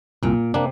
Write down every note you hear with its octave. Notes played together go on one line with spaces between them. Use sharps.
C2 A#2
C3 A#3 D4